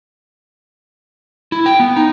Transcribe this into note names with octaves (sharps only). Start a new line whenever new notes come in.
E4
G5
B3
D#4